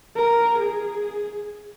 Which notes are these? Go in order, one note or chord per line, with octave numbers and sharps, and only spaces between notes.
A#4
G#4